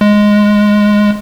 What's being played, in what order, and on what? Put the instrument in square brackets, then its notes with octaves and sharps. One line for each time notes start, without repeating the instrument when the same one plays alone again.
[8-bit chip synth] G#3